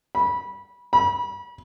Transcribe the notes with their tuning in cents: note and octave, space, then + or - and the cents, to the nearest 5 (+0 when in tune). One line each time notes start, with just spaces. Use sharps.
B5 -20
B5 -35